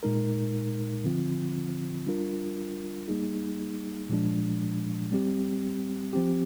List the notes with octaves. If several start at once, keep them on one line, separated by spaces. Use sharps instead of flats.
A#2 G#3 D#4 A#4
D3 F3 C4 F4
G3 D4 F4 A#4
G3 A#3 D#4 G#4
A#2 F3 G#3 D4
G3 C4 G4
F3 C4 G4